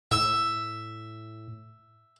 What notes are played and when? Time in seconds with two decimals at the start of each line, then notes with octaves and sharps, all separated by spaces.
0.11 A2 E5